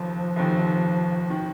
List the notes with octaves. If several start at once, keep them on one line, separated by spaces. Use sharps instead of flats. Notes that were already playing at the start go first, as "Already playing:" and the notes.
Already playing: F1 D#2 F3
F1 D#2 D#3
D#3